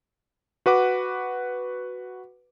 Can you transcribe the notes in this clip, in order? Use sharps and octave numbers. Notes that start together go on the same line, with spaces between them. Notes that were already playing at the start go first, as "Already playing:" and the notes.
F#4 B4 F#5 D6